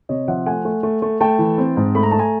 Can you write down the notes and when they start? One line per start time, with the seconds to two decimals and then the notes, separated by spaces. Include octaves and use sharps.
0.09 C3 C#5 D#5
0.28 F3 E5 F#5
0.46 A3 F#5 G#5
0.65 A3
0.83 A3
1.02 A3
1.20 A3 G5 A5
1.39 E3
1.58 C4
1.77 G#2
1.95 A3 B5
2.03 A#5
2.11 A3 A5
2.19 G#5 A#5